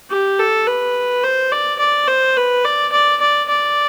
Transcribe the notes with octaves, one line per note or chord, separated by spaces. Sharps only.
G4
A4
B4
C5
D5
D5
C5
B4
D5
D5
D5
D5